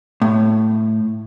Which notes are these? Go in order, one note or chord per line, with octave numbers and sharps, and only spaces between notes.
A2